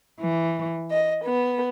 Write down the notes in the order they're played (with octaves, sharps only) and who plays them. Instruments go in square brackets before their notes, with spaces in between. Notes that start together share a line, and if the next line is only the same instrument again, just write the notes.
[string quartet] E3
D#5
B3